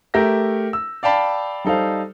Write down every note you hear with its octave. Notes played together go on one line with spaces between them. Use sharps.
A3 G4 A#4 E5 G6 A#6
E6
D5 F5 G5 A5 B5
G3 D#4 A4 C5 F5